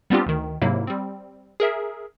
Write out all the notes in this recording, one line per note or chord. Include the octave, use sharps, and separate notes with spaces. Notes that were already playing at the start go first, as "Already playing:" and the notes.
G3 B3 C4 D4 F4 G4
D2 D#3
G#2 C3 F#3 A#3 E4
G3 C4
G#4 A#4 E5